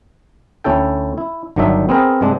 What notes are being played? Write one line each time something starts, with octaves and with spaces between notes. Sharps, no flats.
D2 C#4 E4 A4 G5
E4
G1 D#3 F#3 D4 D#4 E5
B3 C4 G#4 A#4
G2 C3 G#3 D4